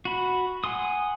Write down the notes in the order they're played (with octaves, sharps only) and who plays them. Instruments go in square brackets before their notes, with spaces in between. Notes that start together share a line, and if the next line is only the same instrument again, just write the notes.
[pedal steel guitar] F#4 B5
F#5 G#5 C6 D#6